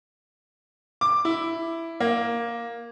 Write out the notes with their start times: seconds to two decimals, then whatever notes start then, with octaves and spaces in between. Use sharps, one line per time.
1.01 D6
1.25 E4
2.00 A#3